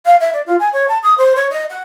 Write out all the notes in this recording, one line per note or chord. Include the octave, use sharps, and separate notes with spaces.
F5
E5
D5
F4
G#5
C#5
A5
D#6
C5
C#5
D#5
F#5